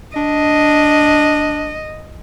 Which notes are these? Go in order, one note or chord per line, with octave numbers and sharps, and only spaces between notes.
D4 D#5